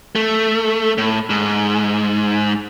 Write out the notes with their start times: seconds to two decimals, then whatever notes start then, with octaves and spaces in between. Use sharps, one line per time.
0.15 A3
0.98 A2
1.30 G#2